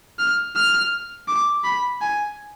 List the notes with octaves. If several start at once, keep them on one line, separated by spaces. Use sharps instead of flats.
F6
F6
D6
B5
G#5